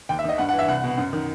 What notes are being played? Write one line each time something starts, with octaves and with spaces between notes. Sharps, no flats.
D#2 G5
E5
D#3 D#5
G2 F#5
F#5
E3
E5
C2 F#5
B2
F#2
D#3